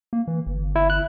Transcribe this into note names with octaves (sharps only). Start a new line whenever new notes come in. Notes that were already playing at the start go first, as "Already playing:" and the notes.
A#3
E3
G1
E4
F#6